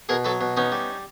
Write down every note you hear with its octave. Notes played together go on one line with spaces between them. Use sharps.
B2 G#4 A#4
F#3 A4 B4
B2
B3 C#4 D#4
G3